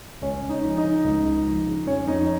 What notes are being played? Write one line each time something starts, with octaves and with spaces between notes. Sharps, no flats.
C#2 C#4 C#5
C#2
D#4 D#5
F3
D#4 D#5
C#3
C#2
C#2
F3
C#3
F2 C#4 C#5
F2 D#4 D#5